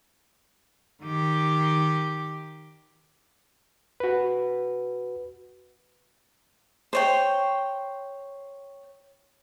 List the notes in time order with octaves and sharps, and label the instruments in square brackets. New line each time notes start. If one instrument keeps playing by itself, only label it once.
[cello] D#3 G4
[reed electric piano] F#4 B4
[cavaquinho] C5 C#5 G5